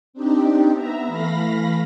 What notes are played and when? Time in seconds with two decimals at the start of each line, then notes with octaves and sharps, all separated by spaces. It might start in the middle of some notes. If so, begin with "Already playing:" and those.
0.14 C4 D4 D#4 G4
0.72 B3 E5 A#5
1.07 E3 A3 F5 B5 A#6